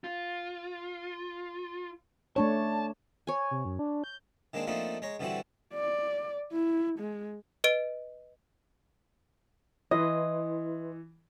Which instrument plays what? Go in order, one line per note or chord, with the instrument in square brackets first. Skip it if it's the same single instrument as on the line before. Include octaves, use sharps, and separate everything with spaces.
[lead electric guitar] F4
[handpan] A3 D4 C#5 [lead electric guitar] A5
[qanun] C#5 G#5
[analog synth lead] C3
F#2
D4
G6
[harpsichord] D#3 G#3 A#3 C4 D4
F3 A3 A#3 C4 D4 D#4
G#3 C#5 A#5
G2 D3 E3 G3 C4 F#4
[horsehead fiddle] D5
E4
G#3
[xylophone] B4 D#5 D7
[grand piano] E3 [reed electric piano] E4 B4 C6 [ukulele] D#5